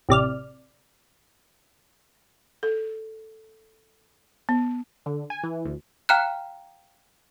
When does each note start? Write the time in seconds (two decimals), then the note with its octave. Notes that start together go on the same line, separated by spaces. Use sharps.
0.09 A1 C3 D5 F6
2.63 A4
4.49 B3
5.06 D3
5.30 G#5
5.44 E3
5.65 D2
6.09 F5 G5 A#5 F6 F#6